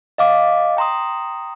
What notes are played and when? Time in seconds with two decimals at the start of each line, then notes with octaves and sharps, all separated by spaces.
0.18 D#5 F5 D6
0.77 G5 A#5 C6 D#6